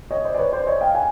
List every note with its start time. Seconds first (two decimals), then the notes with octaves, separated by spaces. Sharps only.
0.11 C#5 D#5
0.24 C5 D5
0.35 D5
0.38 B4 C#5
0.53 C5 D5
0.66 C#5 D#5
0.81 F5 G5
0.95 F#5 G#5